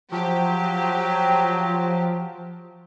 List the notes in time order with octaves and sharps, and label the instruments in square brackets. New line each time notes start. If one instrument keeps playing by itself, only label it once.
[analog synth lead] F3 [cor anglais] F#3 [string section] G4